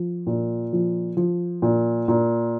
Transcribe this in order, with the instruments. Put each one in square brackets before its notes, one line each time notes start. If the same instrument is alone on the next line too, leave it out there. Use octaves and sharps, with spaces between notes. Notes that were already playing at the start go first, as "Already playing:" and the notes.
Already playing: [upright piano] F3
A#2
F3
F3
A#2
A#2